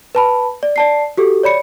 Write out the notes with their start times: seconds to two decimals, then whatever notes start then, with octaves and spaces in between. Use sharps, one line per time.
0.15 B4 A5 B5
0.63 D5
0.76 D5 A5 C7
1.17 F#4 G4 A4
1.43 C#5 D5 B5 C#7